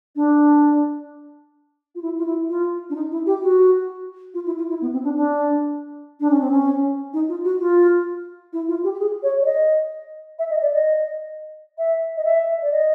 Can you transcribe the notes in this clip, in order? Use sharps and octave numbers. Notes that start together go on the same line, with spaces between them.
D4
F4
E4
F4
E4
F4
D4
D#4
E4
G4
F#4
F4
E4
F4
E4
B3
C4
D4
D4
D4
C#4
C4
C#4
D#4
F4
F#4
F4
E4
F4
G4
G4
G#4
C#5
D5
D#5
E5
D#5
D5
D#5
E5
D#5
E5
D5
D#5